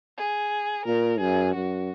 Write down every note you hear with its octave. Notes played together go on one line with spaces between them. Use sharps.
G#4
A#2 A#4
F#2 G#4
F#2 F#4